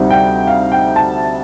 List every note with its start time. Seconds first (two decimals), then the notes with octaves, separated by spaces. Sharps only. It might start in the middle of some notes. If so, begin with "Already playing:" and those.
Already playing: D2 C3 G3 C4 D#4
0.10 G5
0.47 F5
0.72 G5
0.96 A5